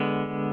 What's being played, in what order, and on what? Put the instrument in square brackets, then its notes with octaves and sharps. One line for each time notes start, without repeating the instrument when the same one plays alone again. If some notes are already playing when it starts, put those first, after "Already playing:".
Already playing: [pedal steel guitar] D3 G#3 B3